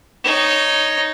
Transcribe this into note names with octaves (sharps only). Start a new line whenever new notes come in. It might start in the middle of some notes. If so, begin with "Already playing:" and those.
D#4 C#5